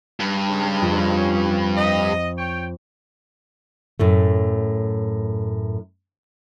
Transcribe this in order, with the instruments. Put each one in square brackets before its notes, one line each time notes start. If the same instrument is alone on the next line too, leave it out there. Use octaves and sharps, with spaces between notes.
[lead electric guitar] G2
[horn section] C#3 G#3
[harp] F2
[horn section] C#4
D#5
C#5 G5
[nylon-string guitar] F#2 A2 A3